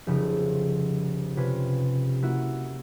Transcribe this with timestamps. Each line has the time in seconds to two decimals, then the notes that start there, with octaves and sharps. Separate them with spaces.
0.07 F1 C#3 F3
1.37 C3 C#4 F4 B4
2.22 A#3 E4 F#4